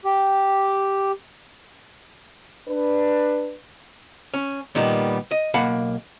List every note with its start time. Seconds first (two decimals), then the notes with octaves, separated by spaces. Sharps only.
0.05 G4
2.68 D4 B4
4.34 C#4
4.75 A#2 D#3 G3 B3
5.31 D#5
5.54 B1 A#3 F5 F#5 A5 B5